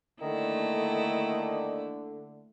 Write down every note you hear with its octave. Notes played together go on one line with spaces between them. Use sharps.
D3 D#3 A3 A#3 E4